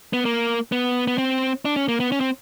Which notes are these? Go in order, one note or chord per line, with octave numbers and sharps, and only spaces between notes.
B3
A#3
B3
B3
C4
D4
C#4
A#3
B3
C#4
C4